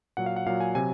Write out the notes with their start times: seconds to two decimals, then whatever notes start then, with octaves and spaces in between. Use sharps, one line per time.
0.17 A#2 F#3 F#5
0.26 F5
0.36 F#5
0.46 A#2 F#3 F5
0.60 G#5
0.75 C3 F#3 G#5